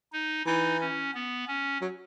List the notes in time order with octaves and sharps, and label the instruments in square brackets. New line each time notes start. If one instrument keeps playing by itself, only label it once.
[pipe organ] D#4
[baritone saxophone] E3 [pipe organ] D#4
[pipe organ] C#4
B3
C#4
[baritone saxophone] F#3